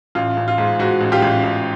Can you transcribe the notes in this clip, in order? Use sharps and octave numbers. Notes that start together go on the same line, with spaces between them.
A1 F4
A1
F4
G#2
G#2 F#4
A1
F4 G4
A1
A1